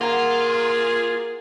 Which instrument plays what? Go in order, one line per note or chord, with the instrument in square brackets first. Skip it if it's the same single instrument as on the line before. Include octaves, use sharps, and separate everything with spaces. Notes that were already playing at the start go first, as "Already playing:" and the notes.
[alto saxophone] A#3 [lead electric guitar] F4 [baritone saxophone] G#4 [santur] F#5 A#5